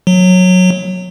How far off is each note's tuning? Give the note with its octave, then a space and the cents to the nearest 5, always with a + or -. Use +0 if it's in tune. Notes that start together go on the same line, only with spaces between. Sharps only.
F#3 -15